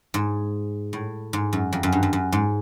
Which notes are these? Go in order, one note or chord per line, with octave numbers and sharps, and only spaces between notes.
G#2
A2
G#2
F#2
F2
F#2
G2
F#2
F#2
G#2